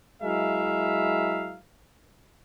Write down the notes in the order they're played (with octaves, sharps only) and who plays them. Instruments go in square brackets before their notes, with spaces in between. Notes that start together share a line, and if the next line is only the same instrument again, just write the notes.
[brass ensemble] F#3 G#3 E4 A#4 E5 F5